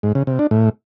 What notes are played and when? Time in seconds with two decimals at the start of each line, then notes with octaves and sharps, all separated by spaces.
0.03 G#2
0.15 C#3
0.27 C3
0.39 D4
0.51 A2